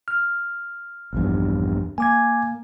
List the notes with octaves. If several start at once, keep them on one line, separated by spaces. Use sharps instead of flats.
F6
A#1 E2 G2
A#3 G#5 D6 G#6